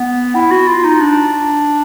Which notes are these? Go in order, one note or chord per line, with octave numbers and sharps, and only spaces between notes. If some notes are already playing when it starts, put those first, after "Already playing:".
Already playing: B3
E4
F#4
F4
D#4
D4